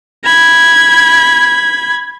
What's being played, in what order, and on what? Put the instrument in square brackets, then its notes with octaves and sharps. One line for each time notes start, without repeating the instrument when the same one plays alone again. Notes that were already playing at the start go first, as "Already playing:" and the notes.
[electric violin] B5 G#6